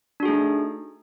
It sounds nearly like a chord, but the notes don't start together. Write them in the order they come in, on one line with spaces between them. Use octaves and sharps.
D4 F#4 G#4 A3 D#4